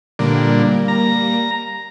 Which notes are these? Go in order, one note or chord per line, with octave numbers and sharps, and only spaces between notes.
A#2 D3 G3 A#3
A#5